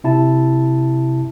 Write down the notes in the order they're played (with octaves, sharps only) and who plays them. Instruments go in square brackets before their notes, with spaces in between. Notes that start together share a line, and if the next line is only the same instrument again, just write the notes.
[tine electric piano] C3 E4 A5